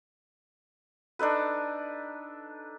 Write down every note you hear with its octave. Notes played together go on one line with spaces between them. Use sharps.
D4 D#4 A4 B4